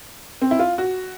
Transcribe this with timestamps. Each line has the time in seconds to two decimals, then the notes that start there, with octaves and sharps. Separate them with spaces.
0.42 C4
0.51 E4
0.59 F4
0.78 F#4